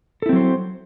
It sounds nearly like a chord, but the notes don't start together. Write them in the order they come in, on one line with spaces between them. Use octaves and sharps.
A4 E4 C4 F#3 C5